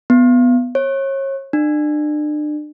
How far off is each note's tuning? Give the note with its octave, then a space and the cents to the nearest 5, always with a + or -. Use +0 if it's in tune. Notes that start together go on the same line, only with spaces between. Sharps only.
B3 +5
C#5 -35
D4 +35